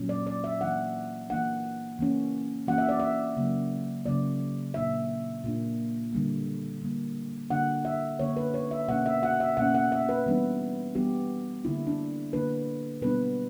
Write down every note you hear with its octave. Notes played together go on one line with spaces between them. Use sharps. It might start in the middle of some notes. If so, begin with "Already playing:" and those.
Already playing: A#2 F#3 C#4
D5
D5
E5
E3 A#3 D4 F#5
E3 A#3 D4 F#5
E3 A#3 C#4
E3 A#3 C#4 F#5
E5
D5
E5
C#3 F#3 A#3
C#3 F#3 A#3 D5
A#2 A#3 D4 E5
A#2 A#3 D4
D3 G3 A#3
D3 G3 A#3
D3 A#3 D4 F#5
E5
D3 A#3 D4 C#5
B4
C#5
E5
B2 A#3 C#4 F#5
E5
F#5
E5
B2 A#3 C#4 F#5
F#5
E5
B4
E3 G3 B3 D4
E3 G3 B3 D4 G4
D3 A#3 D4 E4
D4
D3 A#3 D4 B4
B2 G3 B3 D4 B4